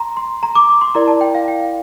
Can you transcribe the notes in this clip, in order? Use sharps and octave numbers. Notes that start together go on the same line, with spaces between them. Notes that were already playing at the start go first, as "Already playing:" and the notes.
Already playing: A#5 C6
C6
A#5
D6
D6
C6
E4 A#4 D5 A#5
A5
G5
F5
G5
F5